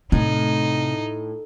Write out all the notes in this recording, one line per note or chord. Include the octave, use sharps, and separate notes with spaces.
A2 C3 D#4